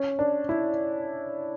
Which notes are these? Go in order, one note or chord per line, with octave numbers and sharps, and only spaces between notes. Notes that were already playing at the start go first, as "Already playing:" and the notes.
Already playing: C#4
D4
E4